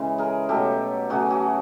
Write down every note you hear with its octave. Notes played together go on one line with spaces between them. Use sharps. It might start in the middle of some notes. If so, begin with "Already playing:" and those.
Already playing: C#3 E3 G#3
G#4 A#4
B2 F#3 A3 G4 A4
C#3 F#3 A3 F#4 G#4
F#4 G#4